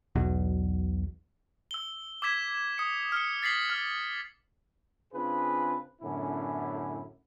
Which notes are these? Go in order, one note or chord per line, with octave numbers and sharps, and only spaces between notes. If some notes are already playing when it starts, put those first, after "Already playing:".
B1 E2 B2 F#3
E6 G7
D6 E6 G#6 B6 E7
D#6 C#7
F6 C#7
A6 B6 C7 F#7
F6
C#3 C4 D4 F4 G#4 B4
F#2 A2 D3 B3 C#4 E4